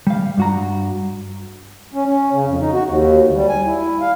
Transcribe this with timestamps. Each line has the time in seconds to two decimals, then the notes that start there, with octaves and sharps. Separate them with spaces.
0.07 G3 F5
0.37 G2 F#4 A#5
1.94 C#4
2.06 C#4
2.32 C#3
2.46 F2
2.60 D#4
2.72 F#4
2.86 D#2
3.22 D2
3.34 G3
3.49 G#5
3.65 E4
4.01 F5